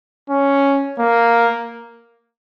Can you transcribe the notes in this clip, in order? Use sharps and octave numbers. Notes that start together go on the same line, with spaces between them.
C#4
A#3